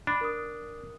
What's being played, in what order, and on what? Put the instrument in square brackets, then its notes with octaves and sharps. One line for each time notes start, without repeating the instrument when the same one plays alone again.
[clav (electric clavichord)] D4 [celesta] B5
[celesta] A#4 D#6